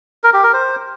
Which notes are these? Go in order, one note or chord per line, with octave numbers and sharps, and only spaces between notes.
A#4
G4
A#4
C5